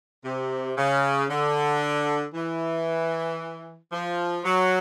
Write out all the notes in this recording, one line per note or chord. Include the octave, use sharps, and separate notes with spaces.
C3
C#3
D3
E3
F3
F#3